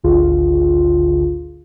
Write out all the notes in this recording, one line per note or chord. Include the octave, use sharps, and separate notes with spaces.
G#1 D2 D3 F4 G#4